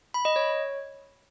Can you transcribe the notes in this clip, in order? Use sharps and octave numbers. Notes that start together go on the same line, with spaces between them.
B5
D#5
C#5